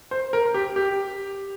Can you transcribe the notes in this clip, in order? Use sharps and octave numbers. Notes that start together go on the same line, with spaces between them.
C5
A#4
G4
G4